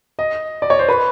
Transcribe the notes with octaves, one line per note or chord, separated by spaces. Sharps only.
D#5
D5
C#5
C5
B4